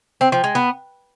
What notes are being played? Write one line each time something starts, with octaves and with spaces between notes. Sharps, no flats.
C4
F3
G#3
B3